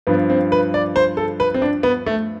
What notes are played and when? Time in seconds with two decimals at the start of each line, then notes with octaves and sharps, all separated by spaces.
0.07 G2 F3 B3
0.30 C4
0.52 B4
0.74 D5
0.96 C5
1.17 A4
1.40 B4
1.54 C4
1.62 D4
1.83 B3
2.06 A3